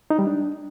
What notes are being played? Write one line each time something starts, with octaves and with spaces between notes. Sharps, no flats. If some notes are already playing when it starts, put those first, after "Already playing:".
D#4
G3
D4